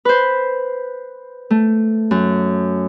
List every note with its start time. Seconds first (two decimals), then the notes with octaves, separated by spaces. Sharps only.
0.05 B4 C5
1.50 A3
2.11 F#2